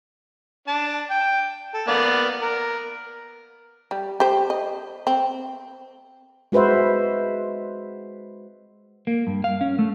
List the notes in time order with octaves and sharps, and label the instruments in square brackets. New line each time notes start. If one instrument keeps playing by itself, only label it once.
[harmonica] D4 A5
G5
A4
A#3 B3 D5
A#4
[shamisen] G3
G4 C5
D#5
C4
[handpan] G#3 F#4 B4 C5 E5
[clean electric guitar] A#3
G2
F5
C#4
A3